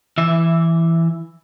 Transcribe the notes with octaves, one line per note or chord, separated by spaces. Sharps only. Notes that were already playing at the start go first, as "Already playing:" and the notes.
E3 E5